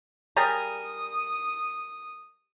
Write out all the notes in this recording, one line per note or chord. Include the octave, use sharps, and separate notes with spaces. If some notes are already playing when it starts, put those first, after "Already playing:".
G3 G#4 A#4 D#6